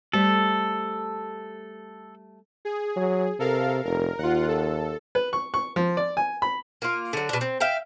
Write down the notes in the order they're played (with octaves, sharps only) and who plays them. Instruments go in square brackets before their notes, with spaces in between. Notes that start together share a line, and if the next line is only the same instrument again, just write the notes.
[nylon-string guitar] G3 A3 C5 [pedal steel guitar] A4
[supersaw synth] G#4
[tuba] F#3
[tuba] C3 [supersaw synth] A4 A#4 F5
[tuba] F1 [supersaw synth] A#4
[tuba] D#2 [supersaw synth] F4 F#5
[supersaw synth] A4
[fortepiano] B4
C#6
C#6
F3
D5
G#5
B5
[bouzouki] A#3 F4
D3 F#3
B2 D4
C4
E5 F5 G5